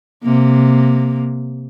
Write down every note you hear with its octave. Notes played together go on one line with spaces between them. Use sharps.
C3 A#3